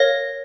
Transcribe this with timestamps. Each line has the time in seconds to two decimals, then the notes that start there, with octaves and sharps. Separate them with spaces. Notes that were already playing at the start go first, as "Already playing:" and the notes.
Already playing: A#4 C#5 F5 A#6